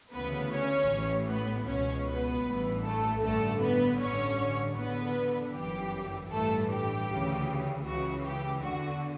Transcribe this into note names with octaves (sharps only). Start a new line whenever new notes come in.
D2 C#3 E3 B3 B4
C#4 C#5
A1 A2 E3
B3 B4
C#2 B2 C#4 C#5
B3 B4
A1 G2 E3
A3 A4
A1 G2 D3 A3 A4
B3 B4
A1 G2 D3 C#4 C#5
E2 D3 B3 B4
G1 F#2 E3 G4
A1 G2 E3 A3 A4
G4
D2 C#3 E3
C#2 C#3 E3 F#4
G4
E2 D3 F#4